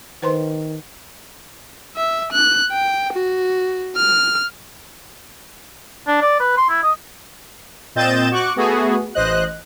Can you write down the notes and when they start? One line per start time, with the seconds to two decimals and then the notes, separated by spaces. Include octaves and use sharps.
0.22 D#3 B4 C5 C6
1.96 E5
2.33 F#6
2.71 G5
3.13 F#4
3.96 F6
6.07 D4
6.22 D5
6.40 B4
6.57 C6
6.69 E4
6.83 D#5
7.95 A#2 C4 D#5 G6 A6 E7
8.31 F#4 C#6 D6 F#6
8.56 A3 B3 F#4 G#4
9.14 A1 C5 D#5 F#6